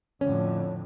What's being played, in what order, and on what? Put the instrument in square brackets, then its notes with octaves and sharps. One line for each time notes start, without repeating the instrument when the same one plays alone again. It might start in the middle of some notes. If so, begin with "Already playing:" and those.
[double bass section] F2 A2 D3 [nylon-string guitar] C#4